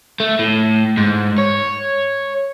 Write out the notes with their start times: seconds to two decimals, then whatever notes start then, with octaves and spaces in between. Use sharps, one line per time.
0.20 A3
0.39 A2
0.97 G#2
1.38 C#5